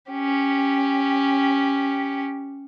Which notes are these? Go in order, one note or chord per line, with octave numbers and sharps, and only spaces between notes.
C#4 G4